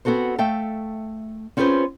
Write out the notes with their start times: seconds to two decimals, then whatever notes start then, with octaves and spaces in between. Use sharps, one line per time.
0.05 B3 C4 F#4 A4 C5
0.38 A3 E5 F5 G5 A5
1.57 C4 C#4 F4 G#4 B4 C5